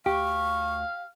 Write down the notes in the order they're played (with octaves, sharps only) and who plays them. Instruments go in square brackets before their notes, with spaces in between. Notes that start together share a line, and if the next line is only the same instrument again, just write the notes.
[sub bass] D2 [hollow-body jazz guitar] G4 [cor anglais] F5 [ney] C#6